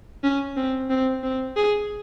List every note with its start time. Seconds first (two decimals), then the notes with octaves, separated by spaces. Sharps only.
0.24 C#4
0.57 C4
0.90 C4
1.23 C4
1.57 G#4